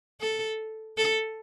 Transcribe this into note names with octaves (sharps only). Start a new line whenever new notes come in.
A4
A4